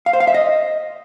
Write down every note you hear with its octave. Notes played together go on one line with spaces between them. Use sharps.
F5
C5
F5
E5
D#5